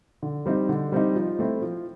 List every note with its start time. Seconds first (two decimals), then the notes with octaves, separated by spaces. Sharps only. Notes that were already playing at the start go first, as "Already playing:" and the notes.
0.22 D3
0.46 G3 C4 D#4
0.69 D3
0.92 G3 C4 D#4
1.15 F3
1.39 A3 C4 E4
1.62 F3